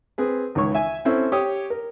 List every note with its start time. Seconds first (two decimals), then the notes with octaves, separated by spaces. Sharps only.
0.18 C4 G#4 B4
0.55 C#2 D#3 E3 E4 C#5 C#6
0.74 E5 G#5
1.05 C4 C#4 E4 A4 C5 E5
1.32 G4 C#5 D#6
1.70 A#4